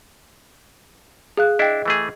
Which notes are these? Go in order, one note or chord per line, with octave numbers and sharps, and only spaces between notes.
G#4 F5 F#6
D4 E4 D#5 G5
E3 A3 G#4